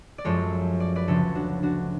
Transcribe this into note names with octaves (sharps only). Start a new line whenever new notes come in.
D5
F#2 F3 G#3 A4 C#5
D5
B4 D5
D2 C#3 F3 A4 C#5
D4 F#4
D4 F#4